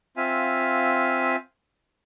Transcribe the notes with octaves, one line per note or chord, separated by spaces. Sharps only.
C4 F4 E5 F5 G#5